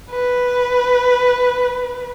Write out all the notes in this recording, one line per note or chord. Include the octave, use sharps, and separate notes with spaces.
B4